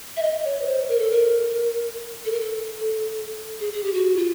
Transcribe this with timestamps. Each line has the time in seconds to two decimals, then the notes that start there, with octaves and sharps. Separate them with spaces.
0.17 E5
0.22 D#5
0.45 C#5
0.62 B4
0.66 C5
0.89 A#4
0.99 A4
1.11 A#4
2.25 A4
2.32 A#4
2.40 A4
3.60 G#4
3.73 G#4
3.84 G4
3.94 F#4
4.16 F4